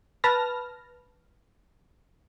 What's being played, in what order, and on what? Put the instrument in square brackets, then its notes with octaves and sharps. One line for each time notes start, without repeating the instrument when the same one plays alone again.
[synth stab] B4 A5 F6 A#6